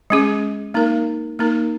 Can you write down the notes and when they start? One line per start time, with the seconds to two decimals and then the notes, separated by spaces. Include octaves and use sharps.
0.10 G#3 C#4 G#4
0.74 A#3 D#4 A#4
1.39 A#3 D#4 A#4